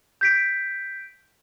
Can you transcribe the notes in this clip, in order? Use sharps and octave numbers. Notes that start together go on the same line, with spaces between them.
G6 B6 D7